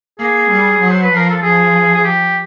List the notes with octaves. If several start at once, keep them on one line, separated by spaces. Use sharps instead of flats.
A#3 G#4
G3
F#3
C5
B4
F3 A#4
A4
F3 G#4
G#4
G4